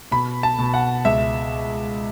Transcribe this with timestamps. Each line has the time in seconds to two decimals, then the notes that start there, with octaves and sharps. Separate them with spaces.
0.11 B2 B5
0.43 A5
0.59 B2
0.74 F#5
1.05 C#2 E5